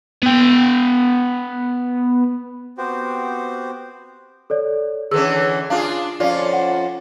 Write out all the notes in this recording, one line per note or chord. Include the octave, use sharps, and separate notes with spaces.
B3 G5
B3 C4 F#4 G4 C5
A4 C#5 D5
D3 E3 C#4 G#4 E6
D4 F4 G#4 F5
F2 C#4 F4 D5 F5
F#5